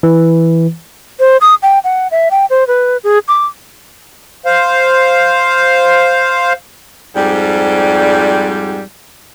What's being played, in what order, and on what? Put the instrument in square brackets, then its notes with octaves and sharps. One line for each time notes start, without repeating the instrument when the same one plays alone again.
[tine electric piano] E3
[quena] C5
D#6
G5
F#5
E5
G5
C5
B4
G#4
D6
[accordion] C5 F5
[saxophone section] F2 G#2 G3